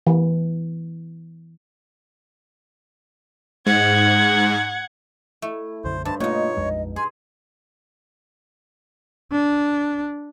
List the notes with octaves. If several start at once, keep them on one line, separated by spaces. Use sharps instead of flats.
E3
G#2 F#5 G#6
A3 E4
B1 F#2 D3 C5
G2 C5 A5
B2 A3 A#3 D#4 F4 C#5
A#1 F2 G#3 D#5
G#4 G#5 C6
D4